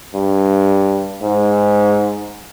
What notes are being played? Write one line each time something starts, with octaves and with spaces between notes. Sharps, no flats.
G2
G#2